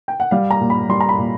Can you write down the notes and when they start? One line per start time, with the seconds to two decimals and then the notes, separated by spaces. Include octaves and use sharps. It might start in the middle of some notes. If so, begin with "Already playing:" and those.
0.08 G5
0.20 F#5
0.31 G3 F5
0.51 A#5
0.61 A#2
0.70 B5
0.89 G3 C6
1.01 A#5
1.09 B5
1.18 A#2